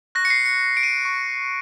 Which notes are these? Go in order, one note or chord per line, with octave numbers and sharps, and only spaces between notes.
C#6 F#6 A#6
C#7
C7
C#7
D7
D#7
C#6